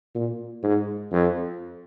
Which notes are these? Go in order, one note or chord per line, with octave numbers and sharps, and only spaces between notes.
A#2
G#2
F2